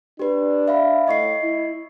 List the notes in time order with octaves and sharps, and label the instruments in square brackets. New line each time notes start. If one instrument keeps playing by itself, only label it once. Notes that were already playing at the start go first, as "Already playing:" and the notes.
[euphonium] D4 [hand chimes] G4 B4
[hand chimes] E5 F5 B5
[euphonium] A2 [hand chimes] D#5 C#6 C7
[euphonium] E4